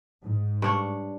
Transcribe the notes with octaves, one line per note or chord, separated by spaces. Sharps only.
G#2
G2 D4 C#5